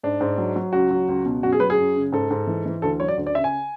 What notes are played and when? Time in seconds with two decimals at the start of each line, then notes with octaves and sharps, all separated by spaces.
0.03 G#2 D4
0.21 G#2
0.38 F#3
0.56 F#3
0.73 C#2 F#4
0.91 F#3
1.09 C#2
1.26 B2
1.43 F#2 F#4
1.52 G#4
1.60 F#3 B4
1.70 G#4
1.78 F#2
1.96 C#3
2.12 G#2 A4
2.31 G#2
2.47 E3
2.66 E3
2.82 D2 A4
3.00 F#3 C#5
3.08 D5
3.18 D2
3.27 D5
3.35 C#3 E5
3.44 G#5